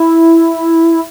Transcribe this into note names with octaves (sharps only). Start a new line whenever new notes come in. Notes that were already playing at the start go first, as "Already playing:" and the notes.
Already playing: E4